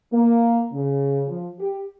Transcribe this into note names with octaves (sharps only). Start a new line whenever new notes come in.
A#3
C#3
F3
G4